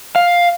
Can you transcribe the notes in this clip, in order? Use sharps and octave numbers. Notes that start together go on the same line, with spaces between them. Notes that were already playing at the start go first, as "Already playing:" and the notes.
F5